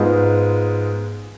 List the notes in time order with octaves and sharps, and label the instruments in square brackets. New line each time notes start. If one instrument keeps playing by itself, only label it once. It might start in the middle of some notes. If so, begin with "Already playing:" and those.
Already playing: [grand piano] G#2 G#3 B3 F4